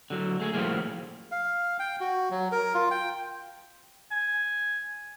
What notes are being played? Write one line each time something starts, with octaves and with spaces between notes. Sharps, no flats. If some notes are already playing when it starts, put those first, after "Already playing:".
D3 F#3
A3 G#4
A2 F3 G3 A3 A#3 G#4
F5
G5
F#4
F#3
A#4
F4
G5
G#5